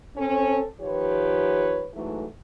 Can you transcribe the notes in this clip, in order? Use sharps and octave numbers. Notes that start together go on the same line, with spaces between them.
C4 C#4 A4
D#3 F3 F4 G4 B4 C#5
G#2 E3 F#3 A3